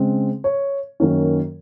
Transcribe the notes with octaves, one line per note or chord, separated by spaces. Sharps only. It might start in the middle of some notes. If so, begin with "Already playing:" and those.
Already playing: C#3 G#3 C4
C#5
F#2 D#3 A#3 C#4